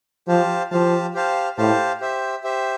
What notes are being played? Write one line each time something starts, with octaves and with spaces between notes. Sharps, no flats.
F3 G4 C5 F5 A5
F3 G4 C5 F5 A5
G4 C5 F5 A5
A2 G4 C5 F5 A5
G4 C5 E5
G4 C5 E5